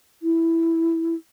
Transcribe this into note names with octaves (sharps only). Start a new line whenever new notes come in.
E4